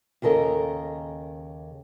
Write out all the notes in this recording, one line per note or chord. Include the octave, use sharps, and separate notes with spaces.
D#2 C#3 A4 A#4 D#5